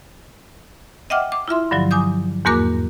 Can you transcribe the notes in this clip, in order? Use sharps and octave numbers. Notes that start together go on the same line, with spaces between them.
D#5 E5 F#5 G5 D6 F6
D6
E4 F4 E5 C6
G2 D3 F3 F#3
G#5 D6 D#6 G6
E2 G#2 A#3 F#4 A#4 D6